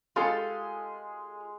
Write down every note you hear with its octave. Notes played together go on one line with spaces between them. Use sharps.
G#3 F4 G4 A4 C6